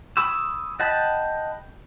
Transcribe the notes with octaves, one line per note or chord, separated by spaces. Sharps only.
G#5 B5 C#6 D#6 E6
D#5 F#5 G5 A5 B5